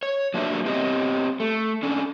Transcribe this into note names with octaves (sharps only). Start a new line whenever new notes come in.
C#5
F#3 A#3 D4 G4 B4 E5
B3 C4 G4 C#5 D#5
A3
C#4 D4 A4